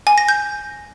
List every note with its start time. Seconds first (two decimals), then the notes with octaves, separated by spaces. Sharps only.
0.07 G#5
0.18 A#6
0.29 G6